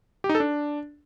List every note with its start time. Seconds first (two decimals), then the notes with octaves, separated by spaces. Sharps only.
0.24 G4
0.29 D#4
0.35 A4
0.40 D4